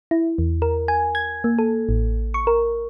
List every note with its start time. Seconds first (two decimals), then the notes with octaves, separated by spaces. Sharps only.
0.11 E4
0.38 E2
0.62 A#4
0.88 G#5
1.15 G#6
1.44 A#3
1.59 A4
1.89 A1
2.34 C#6
2.47 A#4